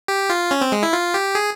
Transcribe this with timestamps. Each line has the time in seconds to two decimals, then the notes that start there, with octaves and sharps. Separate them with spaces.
0.08 G4
0.30 F4
0.51 C#4
0.61 C4
0.72 G#3
0.83 E4
0.93 F4
1.14 G4
1.35 G#4